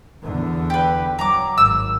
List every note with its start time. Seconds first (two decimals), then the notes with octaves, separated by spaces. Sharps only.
0.23 E2 D3
0.70 G4 B4
1.19 F#3 A#5 D6
1.58 G#1 E6